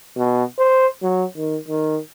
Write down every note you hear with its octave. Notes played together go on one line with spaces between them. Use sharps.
B2
C5
F#3
D#3
D#3